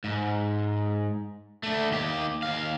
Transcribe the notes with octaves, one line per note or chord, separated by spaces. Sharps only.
G#2
A3 D4
D#2 G4
D#2 F5